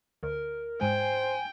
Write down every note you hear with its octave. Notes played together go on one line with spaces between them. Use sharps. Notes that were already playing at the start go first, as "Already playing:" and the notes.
D2 A#4
G#2 G#3 C5 G5 G#5